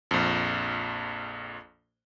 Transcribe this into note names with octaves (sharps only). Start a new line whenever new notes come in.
A#1 F2